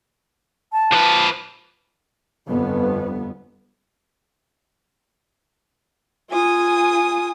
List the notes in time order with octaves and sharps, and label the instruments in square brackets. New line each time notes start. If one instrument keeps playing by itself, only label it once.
[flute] A5
[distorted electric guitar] F3 B4
[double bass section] G1 F2 B3
[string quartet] F4 G#5 D#6